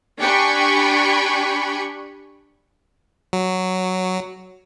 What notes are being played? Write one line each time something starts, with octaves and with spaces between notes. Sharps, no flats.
D4 G4 G5 G#5 B5 C#6
F#3